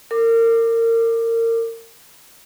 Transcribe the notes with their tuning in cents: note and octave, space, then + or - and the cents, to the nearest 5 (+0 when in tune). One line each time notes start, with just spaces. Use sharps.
A#4 -30 D6 +20